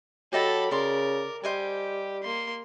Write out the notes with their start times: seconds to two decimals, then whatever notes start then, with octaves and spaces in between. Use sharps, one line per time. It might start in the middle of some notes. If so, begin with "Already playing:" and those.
0.33 F#3 G4 A4 D#5 A5 B5
0.71 C#3 A#4 D5 C6
1.44 G3 G4 C5 D#5 G#5
2.24 A#3 C6